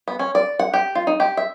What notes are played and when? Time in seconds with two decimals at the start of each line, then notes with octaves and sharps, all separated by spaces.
0.08 B3
0.19 C#4
0.35 D5
0.59 F#5
0.74 G4
0.95 F4
1.07 D#4
1.20 G4
1.37 E5